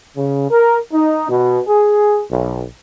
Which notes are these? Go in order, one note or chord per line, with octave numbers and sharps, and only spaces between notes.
C#3
A#4
D#4
B2
G#4
B1